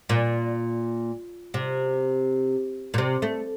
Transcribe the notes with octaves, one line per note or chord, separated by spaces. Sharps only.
A#2
C3
A#2
C3
A3